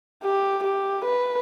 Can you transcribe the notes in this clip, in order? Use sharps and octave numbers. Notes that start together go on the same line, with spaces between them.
G4
G4
B4